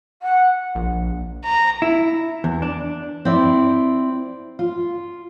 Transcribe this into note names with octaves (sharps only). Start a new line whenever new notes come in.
F#5
A#1
A#5
E4
E2
D4
C4 E4 D5
F4